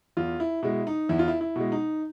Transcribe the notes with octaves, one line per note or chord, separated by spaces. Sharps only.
E2 F4
E4
B2 G#3 E4
D#4
E2 E4
F4
E4
E4
B2 G#3
D#4